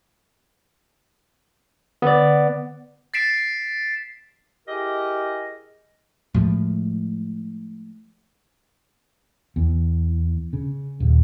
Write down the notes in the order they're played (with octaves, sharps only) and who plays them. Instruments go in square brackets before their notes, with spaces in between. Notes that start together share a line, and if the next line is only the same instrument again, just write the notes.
[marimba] D3 [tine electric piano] B3 D5
[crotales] A6 B6 C7 D7 E7
[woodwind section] E4 G4 G#4 A#4 D#5
[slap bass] A2 F3 G#3
[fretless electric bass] E2
C#3
D#1